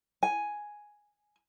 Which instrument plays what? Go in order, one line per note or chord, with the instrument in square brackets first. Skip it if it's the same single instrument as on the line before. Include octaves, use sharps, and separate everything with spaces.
[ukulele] G#5